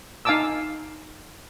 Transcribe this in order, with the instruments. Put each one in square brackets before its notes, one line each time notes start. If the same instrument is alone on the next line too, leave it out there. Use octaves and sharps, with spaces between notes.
[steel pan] D#4 F5 G#5 A5 D6 E6